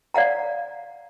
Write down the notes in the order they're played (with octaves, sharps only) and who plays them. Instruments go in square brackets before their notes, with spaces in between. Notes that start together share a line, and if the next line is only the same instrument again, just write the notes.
[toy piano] D5 F5 F#5 A#5